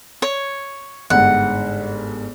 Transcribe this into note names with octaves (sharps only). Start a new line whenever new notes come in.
C#5
G1 G#2 F#5